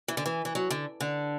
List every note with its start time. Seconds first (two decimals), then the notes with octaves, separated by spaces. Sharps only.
0.08 E3
0.17 D3
0.26 E3
0.45 E3
0.55 F#3
0.70 D3
1.00 D3